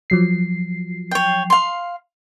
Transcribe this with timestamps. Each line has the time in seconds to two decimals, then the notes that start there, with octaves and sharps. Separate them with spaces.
0.10 F3 F#3 C7
1.11 C#5 G5
1.50 F5 C6